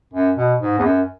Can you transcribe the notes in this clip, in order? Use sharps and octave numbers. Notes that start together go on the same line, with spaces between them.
F#2
B2
G#2
E2
F#2